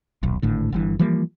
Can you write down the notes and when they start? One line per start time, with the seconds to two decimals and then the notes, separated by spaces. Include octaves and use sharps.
0.23 D#1 B1
0.42 G#1 A2 D3
0.72 G1 G2 E3
0.99 E3 F3 G3 A#3